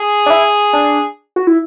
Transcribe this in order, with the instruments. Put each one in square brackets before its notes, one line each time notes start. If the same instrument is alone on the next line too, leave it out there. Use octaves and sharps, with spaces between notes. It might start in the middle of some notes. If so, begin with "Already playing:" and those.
Already playing: [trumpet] G#4
[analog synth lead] D4
E4
D4
F#4
E4